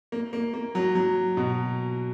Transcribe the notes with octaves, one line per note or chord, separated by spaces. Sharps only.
A#3
A#3
A#3
F#3
F#3
B2